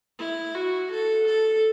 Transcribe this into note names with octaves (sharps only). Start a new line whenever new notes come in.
E4
F#4
A4
A4